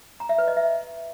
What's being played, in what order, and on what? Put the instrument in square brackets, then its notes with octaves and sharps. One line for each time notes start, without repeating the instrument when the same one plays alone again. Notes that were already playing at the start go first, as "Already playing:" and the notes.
[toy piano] A#5
E5
B4
D#5
E5